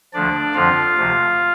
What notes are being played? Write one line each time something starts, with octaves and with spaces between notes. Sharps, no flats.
D2 D3 F3 D4 D5
F2 D3 F3 F4 F5
D2 C3 F3